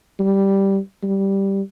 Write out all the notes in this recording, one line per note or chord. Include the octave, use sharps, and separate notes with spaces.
G3
G3